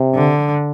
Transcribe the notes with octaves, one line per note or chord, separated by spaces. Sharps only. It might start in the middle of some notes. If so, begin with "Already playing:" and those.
Already playing: C3
D3